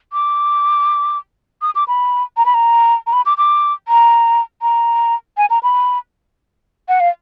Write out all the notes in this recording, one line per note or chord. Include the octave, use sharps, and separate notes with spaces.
D6
D#6
D6
B5
A#5
B5
A#5
A#5
B5
D6
D6
A#5
A#5
G#5
A#5
B5
F#5
F5